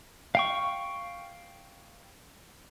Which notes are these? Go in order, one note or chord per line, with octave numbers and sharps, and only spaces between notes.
F5 G5 C#6